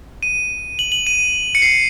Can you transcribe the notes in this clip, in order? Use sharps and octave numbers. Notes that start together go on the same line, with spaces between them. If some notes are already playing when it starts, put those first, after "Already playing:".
D#7
F#7
F#7
D#7
C#7
C7